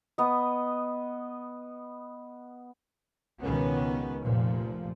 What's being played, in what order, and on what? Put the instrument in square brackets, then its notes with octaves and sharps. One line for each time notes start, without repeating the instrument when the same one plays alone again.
[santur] B3 D#5
[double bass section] C#2 B2 D#3 B3 C#4
F1 A#2 F3